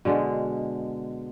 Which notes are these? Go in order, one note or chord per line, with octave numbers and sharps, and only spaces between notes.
B2 D3 G#3